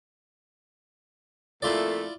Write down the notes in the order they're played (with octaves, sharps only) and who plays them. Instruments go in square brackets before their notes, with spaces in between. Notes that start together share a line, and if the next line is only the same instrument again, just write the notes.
[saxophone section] F2 A#2 A3 [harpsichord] E4 F4 D5